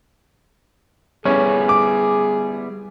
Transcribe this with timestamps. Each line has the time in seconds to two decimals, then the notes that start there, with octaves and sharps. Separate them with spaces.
1.25 G3 B3 C#4 E4 G#4
1.69 D6